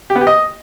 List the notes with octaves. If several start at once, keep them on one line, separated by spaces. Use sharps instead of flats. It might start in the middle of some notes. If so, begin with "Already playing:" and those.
G4
B3
G4
D#5